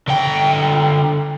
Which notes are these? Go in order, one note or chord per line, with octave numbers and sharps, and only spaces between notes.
D3 G5